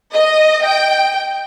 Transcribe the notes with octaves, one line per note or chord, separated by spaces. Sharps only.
D#5
G5